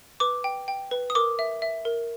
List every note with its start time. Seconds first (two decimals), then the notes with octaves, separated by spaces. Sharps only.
0.20 B4 D6
0.44 G5
0.68 G5
0.91 B4
1.10 D#6
1.15 A#4 D6
1.39 E5
1.62 E5
1.85 A#4